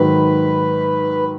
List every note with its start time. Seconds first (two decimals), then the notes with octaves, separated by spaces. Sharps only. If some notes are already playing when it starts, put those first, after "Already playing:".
Already playing: G#2 D#3 F#3 B4